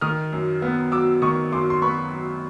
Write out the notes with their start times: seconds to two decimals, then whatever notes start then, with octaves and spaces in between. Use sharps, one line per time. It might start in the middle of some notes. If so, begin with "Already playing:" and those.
0.01 D#3 D#6 F6
0.32 F#2
0.62 B3
0.92 F#3 D6 E6
1.22 D#3 C#6 D#6
1.52 F#2 C6 D6
1.70 C6
1.82 B3 B5 C#6
2.12 F#3